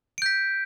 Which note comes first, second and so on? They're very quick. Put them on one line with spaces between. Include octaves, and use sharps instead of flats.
D7 G6 B6